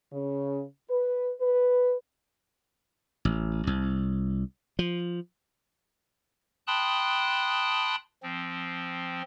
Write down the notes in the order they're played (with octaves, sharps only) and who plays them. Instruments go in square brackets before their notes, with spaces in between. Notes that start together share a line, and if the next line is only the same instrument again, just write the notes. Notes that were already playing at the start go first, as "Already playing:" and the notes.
[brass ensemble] C#3
B4
B4
[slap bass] A1
C2
F3
[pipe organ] G5 A5 B5 C6 D#6 F#6
F3 C4